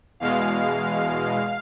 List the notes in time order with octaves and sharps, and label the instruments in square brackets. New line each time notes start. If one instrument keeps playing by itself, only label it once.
[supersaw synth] E2 B2 G#3 F5